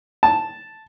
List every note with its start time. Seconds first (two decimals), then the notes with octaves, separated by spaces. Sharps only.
0.23 A5